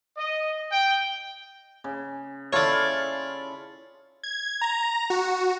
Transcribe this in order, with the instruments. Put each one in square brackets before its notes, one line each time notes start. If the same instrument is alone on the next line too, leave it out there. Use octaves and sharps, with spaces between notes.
[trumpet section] D#5
G5
[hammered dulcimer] C#3
[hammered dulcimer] E4 F4 A4 [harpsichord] C#5 D5
[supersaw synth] G#6
A#5
F#4